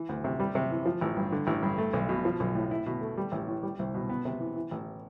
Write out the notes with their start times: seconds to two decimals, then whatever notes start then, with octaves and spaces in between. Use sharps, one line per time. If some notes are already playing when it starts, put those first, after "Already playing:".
Already playing: E3
0.09 D2
0.24 C3
0.40 G3
0.55 C3
0.70 E3
0.86 F3
1.01 A1
1.17 G2
1.32 D3
1.47 A1
1.63 G2
1.78 A3
1.93 B1
2.09 B2
2.25 F3
2.40 B1
2.55 A2
2.71 E4
2.86 B2
3.01 A3
3.17 G3
3.32 A1
3.48 A2
3.63 G3
3.79 C2
3.94 B2
4.09 B3
4.25 C3
4.40 E3
4.56 E3
4.71 A1